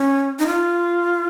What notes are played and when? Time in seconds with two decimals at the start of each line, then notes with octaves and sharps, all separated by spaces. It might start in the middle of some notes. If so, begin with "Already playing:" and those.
Already playing: C#4
0.39 D#4
0.47 F4